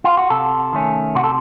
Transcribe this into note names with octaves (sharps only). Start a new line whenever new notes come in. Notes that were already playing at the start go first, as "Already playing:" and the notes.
F4
F#4
C3 A4
D#3 A3 C#4
C3 F#4
A4